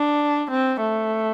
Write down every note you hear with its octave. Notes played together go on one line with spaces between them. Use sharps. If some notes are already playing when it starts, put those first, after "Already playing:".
Already playing: D4
C4
A3